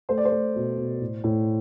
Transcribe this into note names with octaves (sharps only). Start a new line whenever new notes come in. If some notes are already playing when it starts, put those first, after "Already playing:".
A3 C5
D5
C5
A3
B2
B2
A2
A2